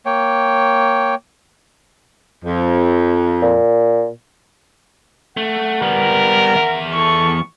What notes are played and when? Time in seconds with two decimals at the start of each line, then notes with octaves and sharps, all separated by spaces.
0.06 A#3 C#5 G5
2.44 F2
3.42 A#2
5.37 A3 F#5
5.82 G3 B3 A#4
6.56 E2 E5
6.94 A4 C#6